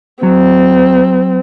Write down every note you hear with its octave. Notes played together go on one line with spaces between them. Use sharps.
F#3 C4